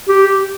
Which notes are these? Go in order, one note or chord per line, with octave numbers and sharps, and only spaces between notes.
G4